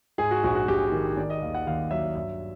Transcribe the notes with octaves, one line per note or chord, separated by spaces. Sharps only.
G#2 G#4
F#4
A#1 F#4
F#4
A#1 G4
D#3
D#3 D5
D#5
D#2 F5
F#5
D#2 F5
F#3 E5
G2 E5